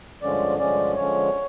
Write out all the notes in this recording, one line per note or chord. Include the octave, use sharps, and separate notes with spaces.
G2 D3 F3 G#3 C#4 D5
G2 D3 F3 G#3 C#4 D5
D3 F3 G#3 C#4 C#5